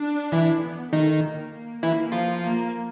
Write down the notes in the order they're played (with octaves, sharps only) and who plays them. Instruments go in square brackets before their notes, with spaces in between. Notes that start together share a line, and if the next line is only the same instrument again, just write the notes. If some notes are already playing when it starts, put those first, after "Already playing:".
Already playing: [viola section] D4
[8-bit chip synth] E3 E4
[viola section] B3
[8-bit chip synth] D#3 D#4 [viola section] A3
[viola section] A#3
A#3
[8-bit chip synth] E3 E4 [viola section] A#3
[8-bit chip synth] F3 F4
[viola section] A#3